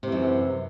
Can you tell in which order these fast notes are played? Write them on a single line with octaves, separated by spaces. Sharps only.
C3 E3 F#2